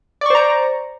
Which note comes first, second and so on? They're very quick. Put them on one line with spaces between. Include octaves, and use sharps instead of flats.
D5 C#6 C5 A#5